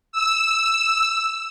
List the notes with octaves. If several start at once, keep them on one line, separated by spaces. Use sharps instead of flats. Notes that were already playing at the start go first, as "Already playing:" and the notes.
E6